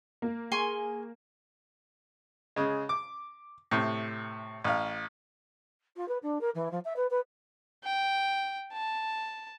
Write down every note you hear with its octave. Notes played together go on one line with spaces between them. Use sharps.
A#3
G#4 G#5 C6 C#6
C#3 G#3
D6
A2 C3
A1 F5
F4
B4
D4
A#4
E3
F3
E5
B4
B4
G5
A5